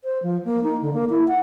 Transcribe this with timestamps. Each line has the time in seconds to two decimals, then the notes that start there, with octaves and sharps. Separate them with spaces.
0.04 C5
0.23 F3
0.45 A#3
0.63 D#4
0.82 D3
0.93 A#3
1.10 E4
1.28 F#5